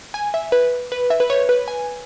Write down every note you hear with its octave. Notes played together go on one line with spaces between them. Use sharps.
G#5
E5
B4
B4
E5
B4
C#5
B4
G#5